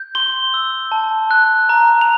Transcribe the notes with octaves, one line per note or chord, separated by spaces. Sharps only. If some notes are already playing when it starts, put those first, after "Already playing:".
Already playing: G6
C6 G7
E6
A5
F#6
A#5
F7